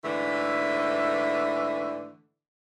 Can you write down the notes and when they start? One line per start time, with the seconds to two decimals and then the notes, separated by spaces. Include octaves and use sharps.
0.04 G#2 D3 E3 A3